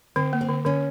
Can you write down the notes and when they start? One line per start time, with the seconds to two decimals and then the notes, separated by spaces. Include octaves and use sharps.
0.16 D3 C4
0.33 A#3
0.41 C4
0.49 D3
0.65 D3 C#4